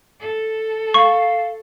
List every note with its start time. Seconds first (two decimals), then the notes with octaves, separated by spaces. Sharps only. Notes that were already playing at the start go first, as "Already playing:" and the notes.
0.21 A4
0.94 F5 C#6